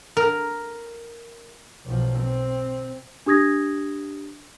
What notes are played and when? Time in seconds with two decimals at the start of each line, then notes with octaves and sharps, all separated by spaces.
0.17 A#4
1.86 B1 F3
2.19 C4
3.26 D4 G4 D#6 G#6 A#6